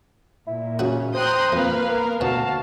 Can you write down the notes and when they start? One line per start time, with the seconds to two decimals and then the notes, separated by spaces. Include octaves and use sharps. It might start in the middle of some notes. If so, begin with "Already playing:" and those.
0.47 A#2 E4
0.79 C#3 C#4 D#4 F#4
1.14 C5 G5 A#5 C6 D#6 F#6
1.52 F2 A#3 A#4 B4 F5
1.88 B3 A#4
2.21 D2 B2 F#4 F5 A5